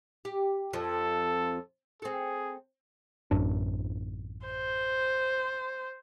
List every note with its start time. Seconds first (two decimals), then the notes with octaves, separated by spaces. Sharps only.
0.25 G4
0.73 F2 F3 A4
2.02 C4 G#4 A4
3.31 A1 F#2 D4
4.46 C5